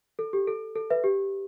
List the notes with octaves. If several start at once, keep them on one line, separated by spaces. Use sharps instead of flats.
A4
G4
A4
A4
B4 E5
G4